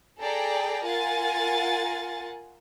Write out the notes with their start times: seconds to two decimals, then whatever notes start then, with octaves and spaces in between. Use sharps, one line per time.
0.20 G#4 A4 D5 G5 A#5
0.85 F4 A#4 F#5 G#5 A6